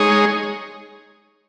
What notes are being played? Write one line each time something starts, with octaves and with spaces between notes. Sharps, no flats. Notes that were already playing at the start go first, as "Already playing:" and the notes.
Already playing: G#3 D#4 G#4 C#5